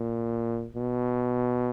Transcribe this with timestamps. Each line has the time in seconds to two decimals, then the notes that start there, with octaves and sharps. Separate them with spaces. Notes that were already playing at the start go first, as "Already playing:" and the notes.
Already playing: A#2
0.76 B2